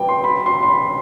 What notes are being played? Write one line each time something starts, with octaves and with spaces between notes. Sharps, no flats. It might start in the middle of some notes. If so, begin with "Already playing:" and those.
Already playing: G2 E3 G3 G5
C6
B5
C6
C6
B5